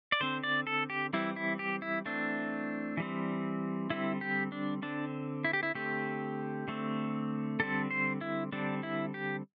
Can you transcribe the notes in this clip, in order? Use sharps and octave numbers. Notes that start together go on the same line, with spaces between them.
D5
D3 C4 C5
D5
A4
G4
E3 G3 C4 E4
E4
G4
E4
E3 A3 C4 D4
E3 G3 C4
D3 G3 C4 E4
G4
D4
D3 C4 D4
E4
G4
E4
D3 A3 C4 G4
D3 A3 C4
D3 G3 C4 A4
C5
E4
D3 G3 C4 D4
E4
G4